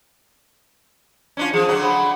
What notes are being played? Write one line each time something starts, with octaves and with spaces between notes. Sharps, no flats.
C#4 D4 F4
F3 G#4
D3 F#3
B5